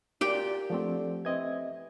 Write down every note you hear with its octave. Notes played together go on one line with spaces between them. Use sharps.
A#2 F#4 G4 D5 G5
D3 F3 A3 C4
E3 C4 D#5 G#6